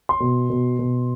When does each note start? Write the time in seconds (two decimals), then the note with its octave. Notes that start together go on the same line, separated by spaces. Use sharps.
0.09 C6
0.20 B2
0.50 B2
0.79 B2